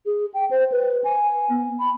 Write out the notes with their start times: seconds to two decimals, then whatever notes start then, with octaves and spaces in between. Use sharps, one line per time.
0.06 G#4
0.34 G5
0.51 C5
0.72 B4
1.04 G#5
1.49 B3
1.79 B5